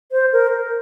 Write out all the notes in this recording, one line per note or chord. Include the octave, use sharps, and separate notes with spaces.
C5
A#4